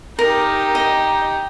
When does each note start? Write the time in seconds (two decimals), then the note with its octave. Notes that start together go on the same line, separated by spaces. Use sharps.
0.19 D#4 G4 A#4
0.75 D#5